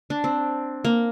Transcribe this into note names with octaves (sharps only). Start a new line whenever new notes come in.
D4
C4
A#3